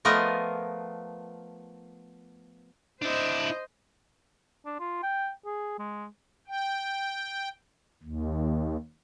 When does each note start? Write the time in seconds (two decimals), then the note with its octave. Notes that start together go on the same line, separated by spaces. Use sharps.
0.05 F3 A3 B3 F4 A#4 D#5
3.02 D4 E4 C5 D#5
4.66 D4
4.80 F4
5.03 G5
5.46 G#4
5.79 G#3
6.48 G5
8.03 D#2